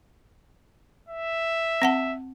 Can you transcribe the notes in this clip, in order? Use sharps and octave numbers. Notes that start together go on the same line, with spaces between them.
E5
C4 F#5 A5